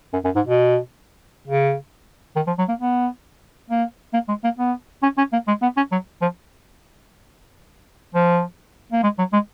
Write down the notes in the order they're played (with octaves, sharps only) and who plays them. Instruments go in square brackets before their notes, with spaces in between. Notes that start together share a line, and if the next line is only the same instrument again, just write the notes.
[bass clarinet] F#2
F#2
G#2
B2
C#3
D#3
F3
F#3
A#3
B3
A#3
A#3
G#3
A#3
B3
C#4
C#4
A#3
G#3
B3
C#4
F#3
F3
F3
A#3
G#3
F#3
G#3